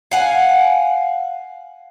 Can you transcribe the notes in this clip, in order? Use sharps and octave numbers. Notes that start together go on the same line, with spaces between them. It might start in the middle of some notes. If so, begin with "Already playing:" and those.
F5 F#5 G#5